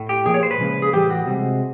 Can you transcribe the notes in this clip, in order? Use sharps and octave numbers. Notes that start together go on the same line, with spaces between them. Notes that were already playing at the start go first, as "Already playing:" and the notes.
Already playing: A2
G4
A#2 F3 G#4
C#5
C5
B4
C#3 F3 G#3
G#4
A2 E3 G3 G4
F#4
C3 F3 G#3